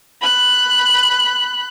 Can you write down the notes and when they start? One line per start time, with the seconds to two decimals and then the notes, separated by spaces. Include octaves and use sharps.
0.21 B5 F#6